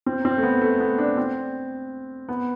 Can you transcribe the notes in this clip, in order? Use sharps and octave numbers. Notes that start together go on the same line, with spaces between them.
C4
C4
A3
B3
A3
B3
D4
C4
B3